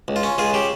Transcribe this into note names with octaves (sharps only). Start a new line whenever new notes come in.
C#2
F4
C#4
C#2 F4 G#4
C#3 G4